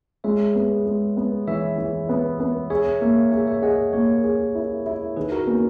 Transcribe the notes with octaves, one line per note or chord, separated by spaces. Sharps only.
G#3 C#5 E5
B3
G#3
B3
E3 C#5 E5
E3
B3
B3
G#4 C#5 E5
A#3 C#5 E5
G#4 C#5 E5
C#5 E5
G#4 D#5 F#5
A#3 A#4 C#5
G#4
E4
E4
D#3 G#4 B4
F#4 A#4
A#3 B3 C#4